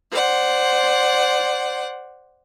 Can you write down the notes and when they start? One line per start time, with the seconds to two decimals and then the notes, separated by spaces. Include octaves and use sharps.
0.11 C5 D5 F#5